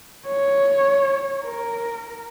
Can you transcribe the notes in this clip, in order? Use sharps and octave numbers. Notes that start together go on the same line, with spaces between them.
C#5
A#4